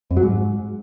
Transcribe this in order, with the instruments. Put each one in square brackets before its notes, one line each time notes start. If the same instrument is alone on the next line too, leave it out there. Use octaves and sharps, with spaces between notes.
[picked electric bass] F2
F#3
G#2